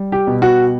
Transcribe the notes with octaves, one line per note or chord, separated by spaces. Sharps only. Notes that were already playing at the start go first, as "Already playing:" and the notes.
Already playing: G3
G4
B2
F#4